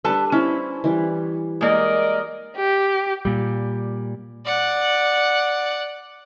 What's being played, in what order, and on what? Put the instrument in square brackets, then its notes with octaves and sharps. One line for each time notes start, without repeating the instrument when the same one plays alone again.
[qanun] G3 D4 [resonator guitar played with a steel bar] A4 B4 A5
[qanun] C4 E4 [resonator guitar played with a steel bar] C#4
[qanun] E3 G3
[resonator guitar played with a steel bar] G#3 A#3 [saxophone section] A#4 D5 D#5
[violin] G4
[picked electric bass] A#2 G3
[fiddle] D5 F#5